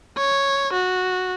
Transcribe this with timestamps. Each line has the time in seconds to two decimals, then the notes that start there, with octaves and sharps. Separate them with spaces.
0.18 C#5
0.73 F#4